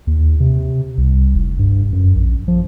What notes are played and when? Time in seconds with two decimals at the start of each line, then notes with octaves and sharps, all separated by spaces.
0.07 D#2
0.40 C3
0.98 C2
1.35 F1
1.59 G2
1.93 F#2
2.15 A#1
2.48 F3